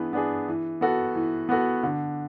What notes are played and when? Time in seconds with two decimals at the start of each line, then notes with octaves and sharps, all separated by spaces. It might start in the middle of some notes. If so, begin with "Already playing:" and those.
Already playing: E3 B3 D4 G#4
0.13 B3 D4 G#4
0.48 E3
0.81 B3 F#4 A4
1.15 E3
1.49 B3 F#4 A4
1.83 D3